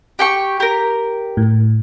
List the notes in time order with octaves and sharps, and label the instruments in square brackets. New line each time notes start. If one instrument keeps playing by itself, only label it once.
[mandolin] G4 G5 C#6
G4 A#4
[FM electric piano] A2